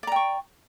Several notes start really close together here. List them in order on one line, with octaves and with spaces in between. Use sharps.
D5 A#5 G5 C#6